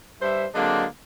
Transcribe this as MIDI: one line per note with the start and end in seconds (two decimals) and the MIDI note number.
0.22 0.46 43
0.22 0.46 72
0.22 0.46 76
0.55 0.85 50
0.55 0.85 54
0.55 0.85 56
0.55 0.85 58
0.55 0.85 60
0.55 0.85 62